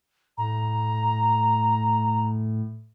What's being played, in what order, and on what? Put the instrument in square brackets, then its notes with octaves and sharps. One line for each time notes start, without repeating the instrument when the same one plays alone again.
[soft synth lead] A2 [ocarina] A#5